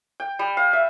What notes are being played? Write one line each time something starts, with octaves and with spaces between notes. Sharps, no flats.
G5
G3
F5
E5